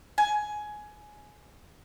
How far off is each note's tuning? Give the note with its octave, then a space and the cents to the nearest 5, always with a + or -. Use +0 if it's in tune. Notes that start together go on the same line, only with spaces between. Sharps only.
G#5 +15